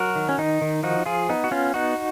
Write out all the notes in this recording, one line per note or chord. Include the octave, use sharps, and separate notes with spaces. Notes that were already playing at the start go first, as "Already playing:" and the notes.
Already playing: F#3 F#4 A#4
D#3
C#4
D#3 D#4
D#3
F3 D#4 F#4
F3 F4 G#4
B3 D#4
F#4
B3 C#4 F4
B3 D#4 F#4